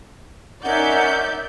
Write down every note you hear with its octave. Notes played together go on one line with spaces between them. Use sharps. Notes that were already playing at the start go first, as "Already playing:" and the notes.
C#4 D#4 A#4 C#5 D5 E5 F#5 G6